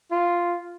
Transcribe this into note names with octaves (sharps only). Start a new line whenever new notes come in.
F4